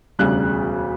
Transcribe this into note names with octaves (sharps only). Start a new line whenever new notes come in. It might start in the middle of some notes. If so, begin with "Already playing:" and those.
E1 D2 C#3 G3 F#6